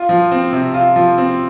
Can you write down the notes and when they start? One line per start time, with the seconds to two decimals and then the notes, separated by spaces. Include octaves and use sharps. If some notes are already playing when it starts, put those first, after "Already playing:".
Already playing: F4
0.09 F3
0.31 C4
0.53 C3
0.74 F4
0.96 F3
1.18 C4